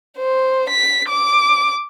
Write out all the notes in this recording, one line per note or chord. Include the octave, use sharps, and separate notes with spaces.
C5
B6
D6